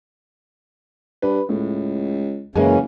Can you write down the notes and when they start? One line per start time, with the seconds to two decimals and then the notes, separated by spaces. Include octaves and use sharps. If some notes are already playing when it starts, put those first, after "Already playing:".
1.22 G2 B4
1.49 C#2 A2
2.56 F#1 F#2 C#3 E3 G#3 A#3 C#4 G#5